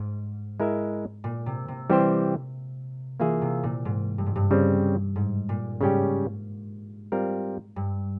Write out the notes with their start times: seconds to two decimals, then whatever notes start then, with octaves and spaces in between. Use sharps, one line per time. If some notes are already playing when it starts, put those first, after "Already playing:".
Already playing: G#2
0.60 G#3 E4 A#4 E5
1.24 A#2
1.46 C3
1.68 C3
1.90 E3 G3 C4 G4 C5
3.20 E3 A#3 F4 G#4 E5
3.41 C3
3.63 A#2
3.85 G#2
4.18 G2
4.26 G#2
4.36 G2
4.51 C#3 G3 C4
5.16 G#2
5.49 A#2
5.81 G#2 C#3 G3 C#4 G4
7.12 G3 C4 F4 A#4
7.76 G2